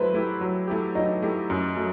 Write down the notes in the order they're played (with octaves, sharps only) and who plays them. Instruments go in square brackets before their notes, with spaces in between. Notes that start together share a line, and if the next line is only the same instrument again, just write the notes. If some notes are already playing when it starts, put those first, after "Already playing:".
Already playing: [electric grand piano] F#3 A3 E4 [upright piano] B4 C5
[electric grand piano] A3 E4 G4
F#3
A3 E4 G4
[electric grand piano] F#3 [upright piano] D#4
[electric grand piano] A3 E4 G4
F#2
F#3 A3